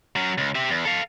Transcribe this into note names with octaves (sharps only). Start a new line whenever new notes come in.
F#3 C#4
C#2
G4 E5
E2
A4 F5